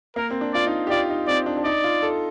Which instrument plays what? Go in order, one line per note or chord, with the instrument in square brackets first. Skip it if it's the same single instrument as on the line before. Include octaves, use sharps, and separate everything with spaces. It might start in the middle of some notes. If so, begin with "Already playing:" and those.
[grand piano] A#3 [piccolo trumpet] A#4
[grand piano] C4
D4
[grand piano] F4 [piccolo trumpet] D5
[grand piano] D#4
G4
[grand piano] F4 [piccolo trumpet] D5
[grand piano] D#4
[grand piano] C4 [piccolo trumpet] D5
[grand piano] D4
D4
[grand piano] D#4 [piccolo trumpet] D5
[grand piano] F4
A4